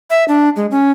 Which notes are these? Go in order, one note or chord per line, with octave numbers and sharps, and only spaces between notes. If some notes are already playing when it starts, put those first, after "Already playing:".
E5
D4
G#3
C#4